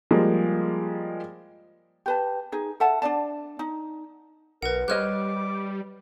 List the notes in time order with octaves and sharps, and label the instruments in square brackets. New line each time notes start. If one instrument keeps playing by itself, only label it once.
[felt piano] F3 G3 G#3 A#3
[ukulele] G4 B4 A5
D#4 G#4
A4 E5 F#5 A5
D4 G#4 D5 A5
D#4
[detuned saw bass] B1 [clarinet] A#4 [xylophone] B4 F#5
[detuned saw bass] G3 [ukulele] C5 C#5 D#5 [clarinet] D6 [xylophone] F6 F#6